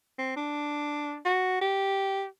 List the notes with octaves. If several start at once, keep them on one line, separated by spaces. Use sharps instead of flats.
C4
D4
F#4
G4